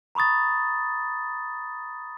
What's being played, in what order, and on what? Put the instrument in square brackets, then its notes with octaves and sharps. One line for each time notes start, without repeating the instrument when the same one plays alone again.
[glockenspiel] A#5 B5 C#6 D#6 A6